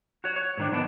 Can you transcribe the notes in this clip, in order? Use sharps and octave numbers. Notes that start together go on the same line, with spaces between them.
F#4 C#5
C#5
G#2 D#3 D4
F#3 B3 D4 D#4